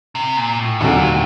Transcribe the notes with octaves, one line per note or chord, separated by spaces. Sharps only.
C3
A#2
A2
D#2 A#2 D3 F#3
A2